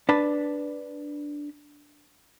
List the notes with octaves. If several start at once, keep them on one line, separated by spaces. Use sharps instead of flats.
D4 B4 A5